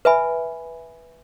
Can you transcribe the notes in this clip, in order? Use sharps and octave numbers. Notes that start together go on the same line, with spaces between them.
B4 E5 G#5 B5